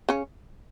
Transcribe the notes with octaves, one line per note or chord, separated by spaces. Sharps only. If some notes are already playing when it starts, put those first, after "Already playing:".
C#3 C#4